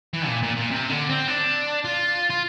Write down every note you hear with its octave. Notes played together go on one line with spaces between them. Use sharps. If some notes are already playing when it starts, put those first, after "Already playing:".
E3
A#2
A#2
A#2
C3
D3
C4
D4
F4
F4